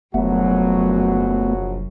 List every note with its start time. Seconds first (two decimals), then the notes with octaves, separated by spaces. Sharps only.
0.14 F1 A#1 F#2 F#3 A3 B3 F#4